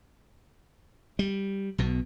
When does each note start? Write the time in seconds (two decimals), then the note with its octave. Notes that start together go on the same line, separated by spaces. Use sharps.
1.19 G3
1.78 B1 B2